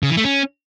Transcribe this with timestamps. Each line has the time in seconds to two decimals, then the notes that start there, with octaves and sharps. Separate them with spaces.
0.03 C#3
0.10 E3
0.17 A3
0.24 C#4